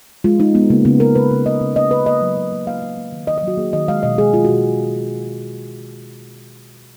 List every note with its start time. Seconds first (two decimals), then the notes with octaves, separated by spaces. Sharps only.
0.24 G#3 F4
0.40 G#3 D#4
0.55 G#3 B3
0.70 C#3 A#3
0.85 C#3 B3
1.00 C#3 A#4
1.15 C#3 B4
1.31 C#3
1.46 C#3 D#5
1.61 C#3
1.76 A#3 D#5
1.91 C#3 B4
2.06 A#3 D#5
2.21 F#3
2.37 C#3
2.52 A#3
2.67 A#3 F5
2.82 A#3
2.97 A#3
3.12 D#3
3.27 D#3 D#5
3.38 D#5
3.43 F#3 F#4
3.58 A#3 G#4
3.73 D#3 D#5
3.88 G#3 F5
4.03 B2 D#5
4.18 G#3 G#4
4.33 G#3 F4
4.44 B2 F#4